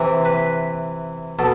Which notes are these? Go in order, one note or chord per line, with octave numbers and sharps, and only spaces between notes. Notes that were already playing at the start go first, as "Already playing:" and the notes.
Already playing: C3 E3
B4
B2 A4